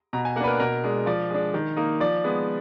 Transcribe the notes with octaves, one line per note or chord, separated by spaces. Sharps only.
B2 A#5
G#5
A#3 D4 B4 F#5
A#4
B2 A#4
G#3 D4
F3 D5
G#3 D4
D#3
A#3 D#4
F3 D5
G#3 B3